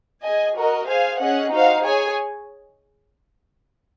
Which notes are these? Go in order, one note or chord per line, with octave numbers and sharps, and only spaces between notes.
G#4 D#5 G#5
F#4 A#4 D#5
G#4 C5 F5 G#5
C#4 G#4 D#5 F#5
D#4 F#4 C5 F5
G#4 C#5 G#5